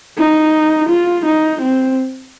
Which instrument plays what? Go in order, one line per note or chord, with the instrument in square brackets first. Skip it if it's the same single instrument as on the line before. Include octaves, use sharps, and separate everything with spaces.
[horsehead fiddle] D#4
F4
D#4
C4